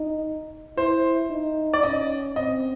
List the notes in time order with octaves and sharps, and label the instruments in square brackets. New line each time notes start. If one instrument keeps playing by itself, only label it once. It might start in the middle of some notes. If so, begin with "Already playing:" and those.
Already playing: [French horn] D#4
[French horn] E4 [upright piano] C5
[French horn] D#4
[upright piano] D5
[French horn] C#4 [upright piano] D#5
[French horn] C4 [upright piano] D#5